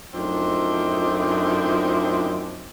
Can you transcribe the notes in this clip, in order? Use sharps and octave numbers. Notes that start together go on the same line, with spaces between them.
F#2 F3 A3 C4 D4 D#4